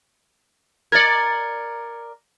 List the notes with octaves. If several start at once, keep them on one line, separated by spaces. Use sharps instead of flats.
A#4 D5 G#6 A6 C#7